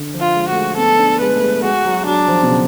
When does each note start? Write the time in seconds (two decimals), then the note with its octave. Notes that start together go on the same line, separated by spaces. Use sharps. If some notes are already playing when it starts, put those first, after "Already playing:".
Already playing: D3
0.14 F3
0.20 F4
0.35 G#3
0.49 A3 F#4
0.57 G#3
0.78 B3 A4
0.99 D4
1.21 G#3 B4
1.36 A3
1.42 G#3
1.63 G#3 F#4
1.85 F#3
2.06 F#3 D4
2.28 F3
2.43 B2
2.49 C#3